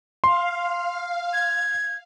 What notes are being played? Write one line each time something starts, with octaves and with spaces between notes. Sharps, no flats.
F5 C6
G#6